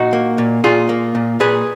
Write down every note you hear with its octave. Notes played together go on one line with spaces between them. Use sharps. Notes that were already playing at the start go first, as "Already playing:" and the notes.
Already playing: A#2 D#4 F#4
A#3
A#2
A#2 F4 G#4
A#3
A#2
A#2 G#4 B4